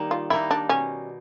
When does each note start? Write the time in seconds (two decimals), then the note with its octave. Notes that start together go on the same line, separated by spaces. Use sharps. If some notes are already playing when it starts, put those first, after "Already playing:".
Already playing: D#3 G3 A#3 D#4
0.11 F4
0.30 G3 A#3 D#4 E4
0.51 D4
0.69 B2 C#4